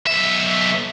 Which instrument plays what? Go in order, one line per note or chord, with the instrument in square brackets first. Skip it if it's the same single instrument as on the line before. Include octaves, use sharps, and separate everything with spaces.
[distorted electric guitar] B1 E5